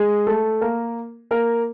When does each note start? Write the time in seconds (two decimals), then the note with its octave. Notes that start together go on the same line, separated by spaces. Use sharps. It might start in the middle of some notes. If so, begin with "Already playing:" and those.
Already playing: G#3 G#4
0.27 A3 A4
0.61 A#3 A#4
1.31 A#3 A#4